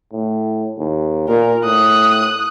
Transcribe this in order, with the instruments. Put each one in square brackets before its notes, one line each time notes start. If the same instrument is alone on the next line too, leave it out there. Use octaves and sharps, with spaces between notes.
[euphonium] A2
D#2
[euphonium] A#2 [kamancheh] A#4
[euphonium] A2 [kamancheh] D#6 F#6